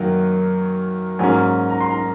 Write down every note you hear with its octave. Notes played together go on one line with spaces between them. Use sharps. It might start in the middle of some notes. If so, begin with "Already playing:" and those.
Already playing: F#2 D#3 F#3 A#3
G#2 F#3 A#3 C#4 G#5
A#5
C6
A#5